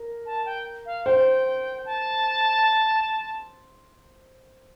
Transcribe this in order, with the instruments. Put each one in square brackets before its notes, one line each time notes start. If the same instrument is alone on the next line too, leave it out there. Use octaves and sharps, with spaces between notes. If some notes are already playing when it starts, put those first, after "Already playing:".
Already playing: [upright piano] A#4
[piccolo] A5
G5
F5
[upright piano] C5 [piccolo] G5
[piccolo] A5